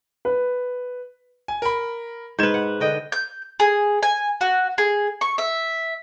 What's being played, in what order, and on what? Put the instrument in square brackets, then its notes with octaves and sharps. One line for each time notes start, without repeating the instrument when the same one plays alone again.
[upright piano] B4
[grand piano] G#5
A#4 B5
[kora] G#2 B4 [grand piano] G6 G#6 E7
[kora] F#5
D3 D#5 G5
[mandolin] G6
G#4
G#5
F#4
G#4
C#6
E5